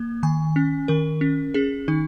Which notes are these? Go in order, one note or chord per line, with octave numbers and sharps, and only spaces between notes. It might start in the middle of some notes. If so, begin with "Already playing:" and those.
Already playing: A#3
D#3 G#5
C#4
D#3 A#4
C#4
C#4 G#4
D#3 D#4